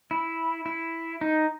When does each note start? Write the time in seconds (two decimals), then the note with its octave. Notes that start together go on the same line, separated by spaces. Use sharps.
0.11 E4
0.66 E4
1.21 D#4